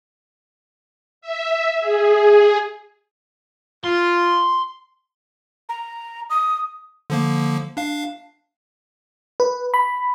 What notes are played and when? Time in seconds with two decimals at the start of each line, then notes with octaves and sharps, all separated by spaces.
1.22 E5
1.80 G#4
3.84 F4 C6
5.69 A#5
6.30 D#6
7.10 D3 F3 A#3
7.77 D4 F5
9.40 B4
9.74 B5